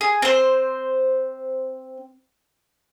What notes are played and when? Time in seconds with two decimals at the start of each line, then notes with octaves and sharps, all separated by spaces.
0.01 G#4
0.22 C4 C5